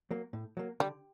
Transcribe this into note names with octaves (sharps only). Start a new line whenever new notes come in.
F#3 A#3
A2
F#3 A#3
D3 G3